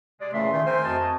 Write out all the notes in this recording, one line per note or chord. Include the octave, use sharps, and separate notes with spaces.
C3 G#3 D5
A#2 C#3 E3 A3 E5 C6
D#3 A3 D#4 F4 G#4
C4 A#4 C5 G#5
F2 F#4 D#5 A5